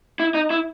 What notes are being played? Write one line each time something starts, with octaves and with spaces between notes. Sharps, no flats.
E4
D#4
E4